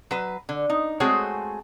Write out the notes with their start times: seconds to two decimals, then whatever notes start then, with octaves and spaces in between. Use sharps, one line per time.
0.11 F#3 B4
0.49 D3
0.70 D#4
1.00 G#3 A3 C4 F#4 G#4 C#5